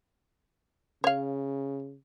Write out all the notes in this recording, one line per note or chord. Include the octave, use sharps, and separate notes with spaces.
C#3 C#5 F5